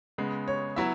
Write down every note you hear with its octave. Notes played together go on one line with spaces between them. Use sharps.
C#3 G#3 B3
C#5
F#3 B3 E4 E5